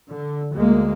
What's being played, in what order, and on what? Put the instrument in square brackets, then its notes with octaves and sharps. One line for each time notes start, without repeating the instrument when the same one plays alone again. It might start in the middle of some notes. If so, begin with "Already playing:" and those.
[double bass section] D3
D2 G#3 A#3